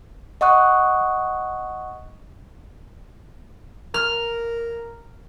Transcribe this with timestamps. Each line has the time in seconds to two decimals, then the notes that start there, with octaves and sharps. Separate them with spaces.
0.41 D#5 F#5 C#6 D#6 F#6
3.94 A#4 F6